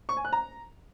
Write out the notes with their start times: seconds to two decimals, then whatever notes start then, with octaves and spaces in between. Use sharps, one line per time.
0.09 C#6
0.17 G#5
0.25 F#6
0.33 A#5